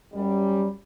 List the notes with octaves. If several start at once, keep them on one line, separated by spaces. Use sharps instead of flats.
F#2 G3